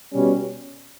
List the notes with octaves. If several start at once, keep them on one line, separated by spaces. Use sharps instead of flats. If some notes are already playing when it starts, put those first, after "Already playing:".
B2 G3 C#4